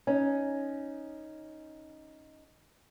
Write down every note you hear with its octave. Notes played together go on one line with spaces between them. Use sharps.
C#4 D#4